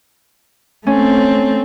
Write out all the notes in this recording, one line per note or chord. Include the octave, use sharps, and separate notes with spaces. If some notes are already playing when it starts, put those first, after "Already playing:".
A3 C4 C#4